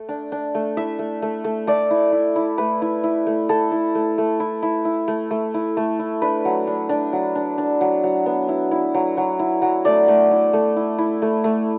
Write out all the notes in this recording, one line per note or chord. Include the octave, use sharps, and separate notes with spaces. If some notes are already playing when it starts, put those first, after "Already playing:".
Already playing: A3
D4
D4
A3
E4 E5
A3
A3
A3
A3 D5
E4
E4
E4
A3 B4
E4
E4
A3
E4 A4
E4
A3
A3
E4
E4
E4
A3
A3
E4
A3
E4
D4 B4
F#3
D4
D4
F#3
D4
D4
F#3
F#3
B3
E4
E4
F#3
F#3
E4
F#3
A3 D5
A3
E4
A3
E4
E4
A3
A3